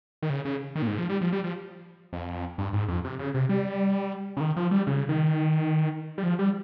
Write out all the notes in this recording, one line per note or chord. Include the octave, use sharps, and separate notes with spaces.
D#3
C#3
C#3
D#3
A#2
G#2
F3
G3
F3
G3
F3
F2
G2
G#2
F2
C3
C#3
C3
G3
C#3
D#3
F3
G3
C#3
D#3
G3
F3
G3